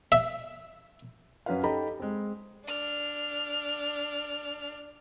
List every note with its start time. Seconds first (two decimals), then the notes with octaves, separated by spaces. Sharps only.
0.12 E5
1.46 F#2 C#4 F#4 B4 F5
1.63 D#4 G4 A4 D#5 A#5 B5
2.00 G#3 C4
2.65 D4 F6